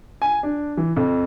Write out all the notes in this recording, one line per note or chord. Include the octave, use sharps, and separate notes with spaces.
G#5
D4
E3
F2